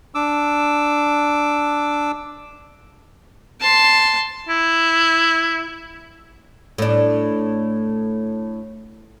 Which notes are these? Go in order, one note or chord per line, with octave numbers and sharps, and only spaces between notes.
D4 D6 E6
A5 C6
E4
A2 D4